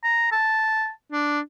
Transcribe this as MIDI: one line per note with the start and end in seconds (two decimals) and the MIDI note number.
0.04 0.29 82
0.32 0.89 81
1.12 1.40 62